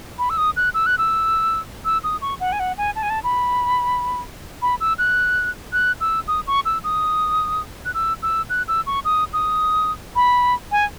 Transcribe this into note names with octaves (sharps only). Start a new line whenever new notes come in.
B5
E6
D#6
F#6
E6
F#6
E6
E6
D#6
C#6
F#5
G#5
F#5
G#5
A5
G#5
A5
B5
B5
E6
F#6
F#6
E6
D#6
C#6
E6
D#6
F#6
E6
E6
F#6
E6
C#6
D#6
D#6
B5
G#5